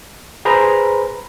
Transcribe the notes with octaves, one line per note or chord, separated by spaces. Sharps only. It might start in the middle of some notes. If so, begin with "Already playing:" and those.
G#4 B4 C5 A#5 B5